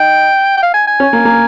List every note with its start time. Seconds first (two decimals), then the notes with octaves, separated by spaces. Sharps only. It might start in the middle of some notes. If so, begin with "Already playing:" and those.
Already playing: D#4 G5
0.57 G5
0.63 F5
0.74 G#5
0.87 G#5
1.00 C#4
1.13 A#3
1.25 A#3